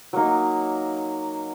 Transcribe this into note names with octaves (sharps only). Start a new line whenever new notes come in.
F#3 A#3 D#4